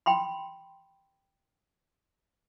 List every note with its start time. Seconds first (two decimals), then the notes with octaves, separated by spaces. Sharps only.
0.06 G5 B5 C6